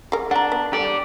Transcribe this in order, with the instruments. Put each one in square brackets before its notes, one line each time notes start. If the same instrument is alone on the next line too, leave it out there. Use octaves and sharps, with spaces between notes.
[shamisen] G#4 A#4
[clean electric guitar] D4 [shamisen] F#5 A#5
[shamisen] B3
[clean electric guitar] G4 D5 [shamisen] A4